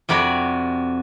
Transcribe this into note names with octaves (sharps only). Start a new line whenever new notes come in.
F2 C3 F#4 D5 B5